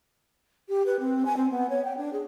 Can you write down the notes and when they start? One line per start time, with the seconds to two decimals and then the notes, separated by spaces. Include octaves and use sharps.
0.69 G4
0.86 B4
1.00 C4
1.25 G#5
1.37 C4
1.51 B3
1.70 C#5
1.84 G5
1.97 D4
2.13 G#4